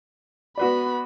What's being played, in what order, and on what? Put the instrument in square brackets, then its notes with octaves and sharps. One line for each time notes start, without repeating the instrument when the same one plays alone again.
[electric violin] B3 B5 [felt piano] F#4 B4 D5